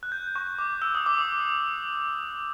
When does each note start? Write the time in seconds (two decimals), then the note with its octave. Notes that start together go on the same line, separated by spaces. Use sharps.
0.03 F#6
0.12 G6
0.36 C#6
0.59 D6
0.82 E6
0.95 D#6
1.06 D6
1.19 D#6